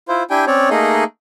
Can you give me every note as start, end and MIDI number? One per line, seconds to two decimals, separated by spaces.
0.08 0.23 64
0.08 0.23 65
0.08 0.23 72
0.30 0.45 62
0.30 0.45 64
0.30 0.45 67
0.30 0.45 79
0.30 0.45 80
0.47 0.69 60
0.47 0.69 61
0.47 0.69 73
0.47 0.69 74
0.70 1.04 57
0.70 1.04 58
0.70 1.04 63
0.70 1.04 68
0.70 1.04 75